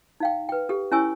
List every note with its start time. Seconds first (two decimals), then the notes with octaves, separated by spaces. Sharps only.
0.20 D#4 F5 G5
0.49 B4 G5
0.69 G4 A4
0.92 C#4 E4 C#5 G#5 C#6 E6